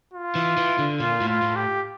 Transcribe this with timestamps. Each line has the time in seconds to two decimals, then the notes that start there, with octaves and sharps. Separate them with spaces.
0.14 F4
0.35 E3
0.57 E3
0.78 D3
0.99 A#2 F4
1.21 A2
1.28 F4
1.42 A2
1.56 G4